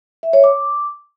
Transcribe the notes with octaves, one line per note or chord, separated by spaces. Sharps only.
E5
C#5
D6